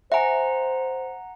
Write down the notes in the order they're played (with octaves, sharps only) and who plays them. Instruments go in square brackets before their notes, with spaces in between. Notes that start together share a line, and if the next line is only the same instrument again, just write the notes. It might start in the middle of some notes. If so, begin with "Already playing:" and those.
[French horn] C5 [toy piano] E5 G#5 [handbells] F#5 A#5